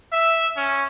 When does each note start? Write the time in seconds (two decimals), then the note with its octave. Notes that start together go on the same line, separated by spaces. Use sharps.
0.12 E5
0.57 C#4